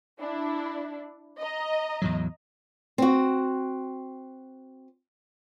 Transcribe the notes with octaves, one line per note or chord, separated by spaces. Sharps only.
D4 E4
D#5 A#5
E2 A2 F#3
C4 F#4